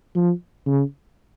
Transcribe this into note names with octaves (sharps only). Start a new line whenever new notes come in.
F3
C#3